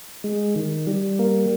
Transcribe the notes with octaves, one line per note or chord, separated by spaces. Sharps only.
G#3
D#3
G3
A#3